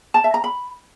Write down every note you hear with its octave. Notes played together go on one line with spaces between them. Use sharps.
A5
E5
A#5
B5